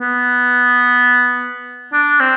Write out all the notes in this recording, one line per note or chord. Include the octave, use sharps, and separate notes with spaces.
B3
D4
C4